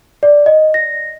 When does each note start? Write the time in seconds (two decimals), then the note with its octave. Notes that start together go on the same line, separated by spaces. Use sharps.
0.23 D5
0.46 D#5
0.74 A#6